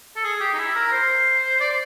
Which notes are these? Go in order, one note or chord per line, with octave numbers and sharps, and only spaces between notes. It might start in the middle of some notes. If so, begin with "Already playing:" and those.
A4
G#4
G4
D#4
E4
A#4
C5
D5